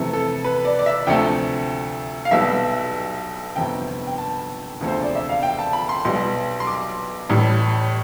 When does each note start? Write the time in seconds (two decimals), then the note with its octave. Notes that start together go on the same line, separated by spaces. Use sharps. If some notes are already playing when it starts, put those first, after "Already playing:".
Already playing: F2 C3 E3 A3
0.13 A4
0.44 B4
0.65 D5
0.79 D5
0.86 E5
1.07 D2 C3 F3 A3 G5
2.25 F5
2.31 B1 B2 G3 E5
3.56 G1 F2 C3 G5
4.07 G5
4.18 A5
4.81 E1 D2 C3 F3 A3
4.88 C5
5.02 D5
5.15 E5
5.29 F5
5.43 G5
5.59 A5
5.73 B5
5.89 C6
6.05 B1 B2 G3 C6
6.60 C6
6.67 D6
7.29 A1 A2 G3